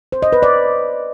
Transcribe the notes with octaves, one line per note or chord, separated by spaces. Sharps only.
C5
D#5
B4
D5